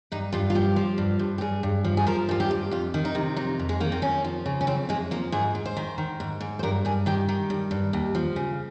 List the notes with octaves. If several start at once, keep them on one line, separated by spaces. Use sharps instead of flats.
G2 D#4
G2 F4
F4
F3 G4
F3
G2
G2
G4
G2 G#4
G2
F3
G#4
F3 A#4
G2 F4
G4
G2
F2 F4
D#3
D#4
C3
F2 D#4
F2
G#3
D#3 A#3
C4
F2 C#4
F3
C#3
C#4
F2 C4
F2 G#3
F3 A#3
G#2 G#4
G#2
C5
D#3
D#3
G#2
G#2
C5
G2 A#4
G2 G#4
D#3 G4
D#3
G2
G2
D#2
F3
C#3